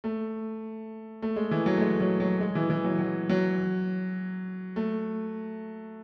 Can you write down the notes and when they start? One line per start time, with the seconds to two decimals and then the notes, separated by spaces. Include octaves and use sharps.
0.04 A3
1.22 A3
1.36 G#3
1.51 E3
1.66 F#3
1.77 A3
1.81 G#3
2.00 F#3
2.20 F#3
2.40 G#3
2.55 E3
2.70 E3
2.84 F#3
2.99 F#3
3.29 F#3
4.76 A3